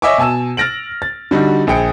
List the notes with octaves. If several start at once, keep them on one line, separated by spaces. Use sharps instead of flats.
C#5 D#5 E5 G#5 C#6 D6
B2 G#5 A5 E6 E7
F6 A6 A#6 D7 F#7
A6
D3 G3 D#4 F#4
A#1 G#4 G5 C#7